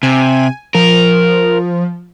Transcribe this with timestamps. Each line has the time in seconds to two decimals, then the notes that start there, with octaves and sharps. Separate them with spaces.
0.03 C3 G#5
0.75 F3 A#4